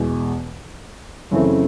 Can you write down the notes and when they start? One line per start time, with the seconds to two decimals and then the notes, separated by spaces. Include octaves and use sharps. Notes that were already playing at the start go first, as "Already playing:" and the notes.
Already playing: E2 B2 G#3
1.31 F#2 C#3 E3 A3 C4